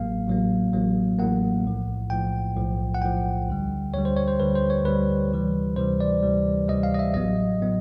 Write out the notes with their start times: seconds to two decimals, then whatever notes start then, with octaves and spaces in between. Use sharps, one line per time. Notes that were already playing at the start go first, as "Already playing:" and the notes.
Already playing: A1 A2 F#3 A#3 F5
0.27 A1 A2 F#3 A#3
0.73 A1 A2 F#3 A#3
1.19 A1 A2 F#3 A#3 F#5
1.65 B1 A2 F3
2.10 B1 A2 F3 G5
2.57 B1 A2 F3
2.94 F#5
3.02 B1 A2 F3 G5
3.48 D2 D3 G3
3.94 D2 D3 G3 C#5
4.05 C5
4.16 C#5
4.28 C5
4.40 D2 D3 G3 B4
4.55 C5
4.70 C#5
4.85 D2 D3 G3 B4
5.32 D2 C3 E3 G3
5.76 D2 C3 E3 G3 C5
6.00 D5
6.23 D2 C3 E3 G3
6.68 D2 C3 E3 G3 D#5
6.83 F5
6.94 D#5
6.99 E5
7.14 A1 A2 F#3 B3 D#5
7.61 A2 F#3 B3